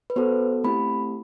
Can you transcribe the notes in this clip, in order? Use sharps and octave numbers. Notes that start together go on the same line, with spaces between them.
B4
B3 F#4 A4 C5
A3 C4 E4 G4 B5